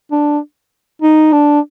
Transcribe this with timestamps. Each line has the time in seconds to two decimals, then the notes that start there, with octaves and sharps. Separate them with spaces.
0.11 D4
1.02 D#4
1.33 D4